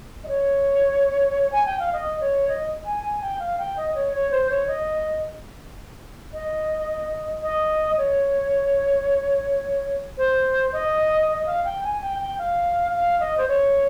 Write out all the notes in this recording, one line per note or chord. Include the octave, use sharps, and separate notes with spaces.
D#5
C#5
G#5
G5
F5
D#5
C#5
D#5
G#5
G#5
G5
F5
G5
D#5
C#5
C#5
C5
C#5
D#5
D#5
D#5
C#5
C5
D#5
D#5
F5
G5
G#5
G5
G5
F5
F5
D#5
C5
C#5